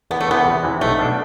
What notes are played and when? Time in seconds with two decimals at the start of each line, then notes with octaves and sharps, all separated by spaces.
0.11 E2 B3
0.21 A3
0.28 C3 E3 B3
0.46 E2
0.64 C3 E3
0.81 B1 A3
0.99 B2 A3 D4